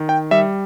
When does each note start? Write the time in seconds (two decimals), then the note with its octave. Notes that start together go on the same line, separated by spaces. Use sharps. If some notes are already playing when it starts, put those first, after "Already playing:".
Already playing: D#3
0.09 G5
0.31 G3 E5